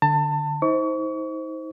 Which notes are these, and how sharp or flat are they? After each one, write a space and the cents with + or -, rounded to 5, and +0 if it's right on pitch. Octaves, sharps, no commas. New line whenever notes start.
D3 +5 A5 +25
D#4 +40 C5 +0 C#6 +35